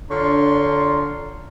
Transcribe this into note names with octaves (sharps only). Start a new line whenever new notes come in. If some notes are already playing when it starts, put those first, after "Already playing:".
D3 D4 F4 C#5 A#5 C6